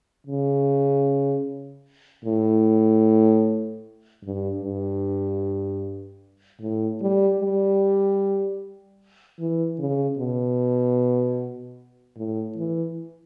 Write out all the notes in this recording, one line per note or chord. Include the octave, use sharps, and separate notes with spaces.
C#3
A2
G2
G2
A2
G3
G3
E3
C#3
B2
A2
E3